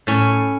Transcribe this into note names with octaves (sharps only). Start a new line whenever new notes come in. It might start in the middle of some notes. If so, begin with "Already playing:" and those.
A2 C#4